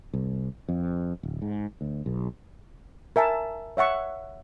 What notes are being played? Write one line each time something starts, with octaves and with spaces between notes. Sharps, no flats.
C2
F2
D1
G#2
D2
B1
A#4 E5 G#5 A5
C#5 E5 F#5 C#6